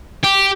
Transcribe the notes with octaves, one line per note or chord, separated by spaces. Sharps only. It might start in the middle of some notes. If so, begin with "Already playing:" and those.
G4